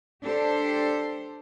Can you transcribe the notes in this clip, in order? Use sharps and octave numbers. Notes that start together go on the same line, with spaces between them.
D4 G4 A4 C5